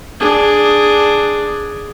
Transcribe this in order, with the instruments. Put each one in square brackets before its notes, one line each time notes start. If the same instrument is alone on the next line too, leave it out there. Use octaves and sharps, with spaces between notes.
[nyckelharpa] D4 G#4